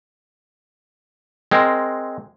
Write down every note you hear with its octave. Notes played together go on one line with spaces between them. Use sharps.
G#3 C4 A#4